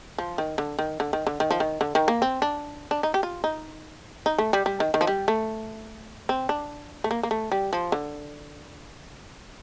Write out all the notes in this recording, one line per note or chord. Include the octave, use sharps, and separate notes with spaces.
F3
D#3
D3
D#3
D3
D#3
D3
D#3
F3
D#3
D3
D#3
A#3
C4
D4
D4
D#4
G4
F4
D#4
D#4
A3
G3
G3
D#3
D#3
F3
G3
A3
C4
D4
A3
A#3
A#3
A3
G3
F3
D3